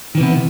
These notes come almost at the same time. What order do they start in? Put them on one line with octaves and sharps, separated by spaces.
D#3 E3 C3 B3